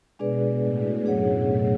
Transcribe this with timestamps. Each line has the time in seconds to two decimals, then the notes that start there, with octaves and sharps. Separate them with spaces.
0.19 B2 G#3 D4 G#4 B4 D5
0.62 A2
1.05 F#2 D4 G#4 C#5 F#5